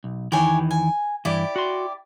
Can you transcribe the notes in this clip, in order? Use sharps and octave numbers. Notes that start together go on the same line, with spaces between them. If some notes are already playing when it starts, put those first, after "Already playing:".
B1
E2 D#3 E3 G4 C#5 G#5
G#5
G2 E3 E4 G4 D5
F#4 C6